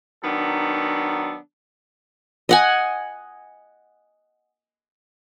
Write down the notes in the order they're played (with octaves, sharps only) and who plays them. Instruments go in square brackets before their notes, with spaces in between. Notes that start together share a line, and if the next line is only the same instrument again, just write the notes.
[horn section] D#3 F#3 B3 D4 A4
[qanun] D#5 F#5 G#5